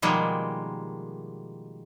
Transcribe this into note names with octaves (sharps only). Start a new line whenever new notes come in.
B2 D#3 F3 G3 G#3 A#3